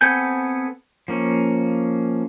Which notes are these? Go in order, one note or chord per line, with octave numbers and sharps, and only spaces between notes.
B3 C4 A4 G#5 G6
F3 A#3 C#4